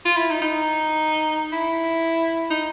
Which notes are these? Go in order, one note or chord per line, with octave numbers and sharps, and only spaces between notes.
F4
E4
D#4
D#4
E4
D#4